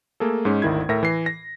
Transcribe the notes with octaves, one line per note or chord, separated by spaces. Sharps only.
A3 A#3 G#4 A4
G#2 G#3 C#4
G#1 D2 D#3 E4 G#6
A2 A#4 E5 A#6
E3 C7
A#6